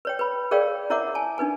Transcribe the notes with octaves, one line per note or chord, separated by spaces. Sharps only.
B4 C#5 G5
B4 B5
G#4 A#4 C#5 D5 F5 G5
E4 A#4 C#5 E5 F#5 D6
G#5 A5
D4 D#4 B4 G#5